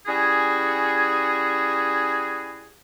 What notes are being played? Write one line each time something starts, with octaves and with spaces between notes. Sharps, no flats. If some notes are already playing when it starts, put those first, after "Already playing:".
G3 C#4 E4 F#4 G#4